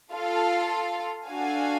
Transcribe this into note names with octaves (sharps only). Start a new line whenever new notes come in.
F4 A4 F5
D4 F#4 A4 F5 G#5